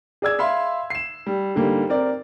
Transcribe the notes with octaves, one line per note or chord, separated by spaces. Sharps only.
G#4 D5 E6 G#6
E5 F5 B5 C6
C7 E7
G3
G#2 D3 G3 A#3
C4 A#4 D5